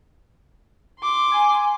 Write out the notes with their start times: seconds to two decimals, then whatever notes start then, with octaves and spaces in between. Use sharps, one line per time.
1.00 C6 D6
1.31 G#5